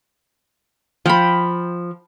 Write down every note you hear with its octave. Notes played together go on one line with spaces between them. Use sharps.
F3 G5 B5